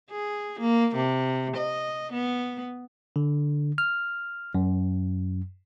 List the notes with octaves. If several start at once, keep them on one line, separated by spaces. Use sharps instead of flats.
G#4
A#3
C3
D#5
B3
D3
F6
F#2